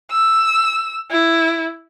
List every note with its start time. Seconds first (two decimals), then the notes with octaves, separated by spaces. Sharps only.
0.11 E6
1.11 E4